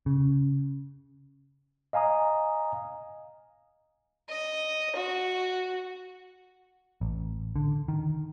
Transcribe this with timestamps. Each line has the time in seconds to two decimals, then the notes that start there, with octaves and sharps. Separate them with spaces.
0.06 C#3
1.93 D#5 F5 G#5 A#5 D#6
4.29 D#5
4.95 F#4
7.01 A1
7.56 D3
7.88 D#3